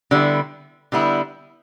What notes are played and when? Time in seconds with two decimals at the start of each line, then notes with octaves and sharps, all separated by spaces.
0.11 D3 G3 B3 E4
0.92 D3 G3 B3 E4